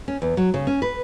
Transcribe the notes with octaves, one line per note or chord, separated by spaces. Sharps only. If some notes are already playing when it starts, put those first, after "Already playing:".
C#4
E2
F#3
C#3
C#4
B4